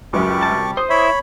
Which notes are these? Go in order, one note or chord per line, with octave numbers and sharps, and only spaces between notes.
C#2 F#2 G3 C#6 D6
C2 A5
C5 D#6
E4 C#5 E5 B5